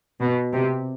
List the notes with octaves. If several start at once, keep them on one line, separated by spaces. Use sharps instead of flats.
B2
C3